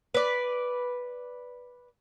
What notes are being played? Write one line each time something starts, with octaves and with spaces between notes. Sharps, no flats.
B4 D5